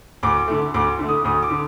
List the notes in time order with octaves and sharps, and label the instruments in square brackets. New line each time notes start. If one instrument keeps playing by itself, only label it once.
[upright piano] D2 D6
D3 A3
D2 D6
D3 A3
D#6
D2 D#6
D6
D3